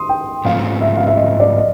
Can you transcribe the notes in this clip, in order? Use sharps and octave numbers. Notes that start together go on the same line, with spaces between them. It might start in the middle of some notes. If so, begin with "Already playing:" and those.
Already playing: C6 D#6
G5
G#2 F3 A3 C4 F5
E5
F5
E5
D#5
D5
D#5